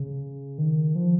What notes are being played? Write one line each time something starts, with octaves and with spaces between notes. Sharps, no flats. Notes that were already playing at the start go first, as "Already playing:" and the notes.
Already playing: C#3
D#3
F3